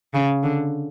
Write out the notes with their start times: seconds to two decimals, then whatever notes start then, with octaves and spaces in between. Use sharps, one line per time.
0.14 C#3
0.43 D3